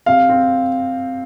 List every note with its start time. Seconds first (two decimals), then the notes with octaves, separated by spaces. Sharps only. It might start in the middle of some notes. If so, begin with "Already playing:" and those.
0.06 C3 F5
0.29 C4